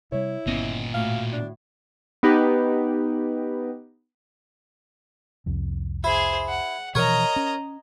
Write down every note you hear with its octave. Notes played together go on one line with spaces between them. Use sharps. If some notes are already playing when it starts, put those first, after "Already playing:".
C3 G3 E4 C#5
G1 A#2 B3 C#4 D#5
A2 F#4 F5
D4
B3 D#4 G4 B4
C2 F2
E4 G#4 C5
F#5
B2 E3 F3 A#4 C#5 D#5 A#5
C#4